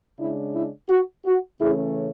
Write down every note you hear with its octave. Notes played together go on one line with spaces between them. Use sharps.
C#3 G#3 D4 E4
E4
F#4
F#4
C#3 E3 A3 C#4 E4 G#4